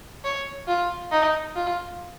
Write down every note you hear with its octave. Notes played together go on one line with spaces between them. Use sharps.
C#5
F4
D#4
F4